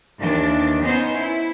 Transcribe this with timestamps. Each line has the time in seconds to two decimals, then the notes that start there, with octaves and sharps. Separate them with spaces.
0.20 D#2 D#3 E3 D4
0.83 B3 C#4 D#4 C5
1.16 E4